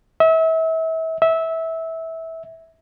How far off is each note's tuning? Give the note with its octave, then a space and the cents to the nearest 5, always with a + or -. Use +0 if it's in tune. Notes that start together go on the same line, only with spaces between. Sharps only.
E5 -35
E5 -20